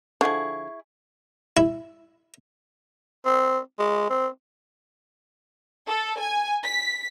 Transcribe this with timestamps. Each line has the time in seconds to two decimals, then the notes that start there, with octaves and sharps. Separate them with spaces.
0.21 D3 F3 E4 G#4 C#6
1.57 E4
3.25 C4
3.79 G#3
4.10 C4
5.87 A4
6.19 G#5
6.63 B6